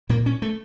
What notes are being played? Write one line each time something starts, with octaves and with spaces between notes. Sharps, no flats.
A#2 A#3
C#4
A3